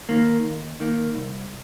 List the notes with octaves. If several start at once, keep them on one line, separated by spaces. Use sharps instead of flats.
D#3 A#3
D#2
D#3 A#3
C2